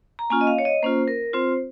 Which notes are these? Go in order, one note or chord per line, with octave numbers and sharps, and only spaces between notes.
A#5
A#3 C#4 F4 G#5
D#5
F5
C#5
D#5
A#3 C#4 F4 C5
A#4
C4 F4 C5